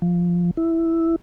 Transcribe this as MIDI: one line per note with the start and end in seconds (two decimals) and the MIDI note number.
0.02 0.51 53
0.57 1.16 64